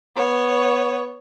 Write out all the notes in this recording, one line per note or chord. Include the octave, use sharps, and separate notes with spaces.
B3 C#5